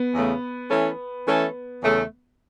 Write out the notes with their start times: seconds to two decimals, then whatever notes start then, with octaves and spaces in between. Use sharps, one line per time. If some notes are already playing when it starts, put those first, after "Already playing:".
Already playing: B3
0.13 E2 C#3 A3
0.70 E3 A3 C#4 A4 C#5
1.25 E3 A3 C#4 A4 C#5
1.82 E2 C#3 A3